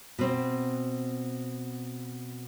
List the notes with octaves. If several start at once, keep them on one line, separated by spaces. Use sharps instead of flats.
B2 C4